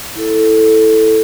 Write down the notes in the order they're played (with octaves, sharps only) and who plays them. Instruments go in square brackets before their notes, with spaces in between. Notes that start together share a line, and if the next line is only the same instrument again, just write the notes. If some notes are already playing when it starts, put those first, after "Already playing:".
[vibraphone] E4 A4